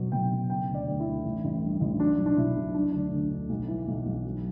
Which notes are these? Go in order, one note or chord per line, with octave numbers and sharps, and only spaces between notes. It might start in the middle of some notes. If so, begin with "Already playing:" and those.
Already playing: B2 F#3
B2 G5
B2
C#3 G5
D2
D5
D2
E4
D2
A1
A1
G2
A1
F#3 D4
B1
D4
B2 E4
B1
F#3 D4
D2 D4
D2
D2
B1
E3
B1
B1
F#3